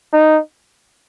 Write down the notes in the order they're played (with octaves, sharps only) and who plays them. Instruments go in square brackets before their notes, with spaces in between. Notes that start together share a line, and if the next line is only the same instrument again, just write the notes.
[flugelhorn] D#4